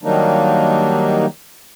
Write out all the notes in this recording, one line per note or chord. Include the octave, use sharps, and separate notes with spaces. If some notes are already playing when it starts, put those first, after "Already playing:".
D#3 F#3 G3 A#3 D4 D#4